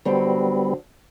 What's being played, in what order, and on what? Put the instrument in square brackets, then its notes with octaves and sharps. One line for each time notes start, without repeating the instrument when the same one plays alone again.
[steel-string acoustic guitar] D3 F#3 C4 [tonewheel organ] G3 B3